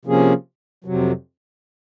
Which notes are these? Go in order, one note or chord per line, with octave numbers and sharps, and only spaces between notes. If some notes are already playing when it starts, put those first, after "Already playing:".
C3 F3 A#3 C#4 G#4
F2 C3 F#3